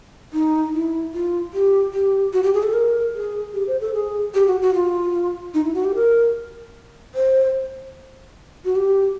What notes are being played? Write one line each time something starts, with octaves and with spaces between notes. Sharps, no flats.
D#4
E4
F4
G4
G4
F#4
G4
G#4
A4
A#4
G#4
G4
C5
A4
G#4
G4
F#4
F#4
F4
D#4
E4
F#4
G4
A#4
C5
F#4
G4